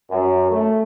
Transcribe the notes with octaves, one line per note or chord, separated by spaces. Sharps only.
F#2
A3